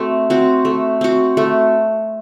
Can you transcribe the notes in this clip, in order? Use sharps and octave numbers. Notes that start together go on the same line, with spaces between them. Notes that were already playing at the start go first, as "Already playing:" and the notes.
Already playing: A3 C4 F#4
C4 F#4
A3
C4 F#4
A3